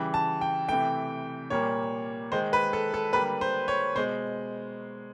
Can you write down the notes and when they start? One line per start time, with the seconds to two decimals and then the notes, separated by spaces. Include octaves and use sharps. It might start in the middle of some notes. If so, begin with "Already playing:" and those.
Already playing: C#3 E3 G3
0.14 A5
0.41 G5
0.68 C3 E3 A3 G5
1.50 A#2 G3 A#3 C#5
2.32 D#3 G#3 C5
2.53 B4
2.73 A4
2.94 A4
3.13 D3 G3 A#3 B4
3.41 C5
3.68 C#5
3.95 B2 G#3 C5